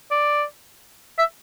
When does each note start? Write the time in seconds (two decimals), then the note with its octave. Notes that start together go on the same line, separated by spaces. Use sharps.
0.11 D5
1.18 E5